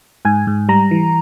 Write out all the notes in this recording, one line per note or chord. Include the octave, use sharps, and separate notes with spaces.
G#2 G#5
G#2
G3 A#5
E3